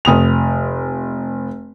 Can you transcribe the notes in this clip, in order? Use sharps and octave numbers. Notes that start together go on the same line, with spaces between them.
F1 D#6 F7